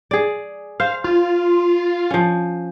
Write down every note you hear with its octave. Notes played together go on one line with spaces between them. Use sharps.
G#4 D5
C5 F5
F4
F3 C#4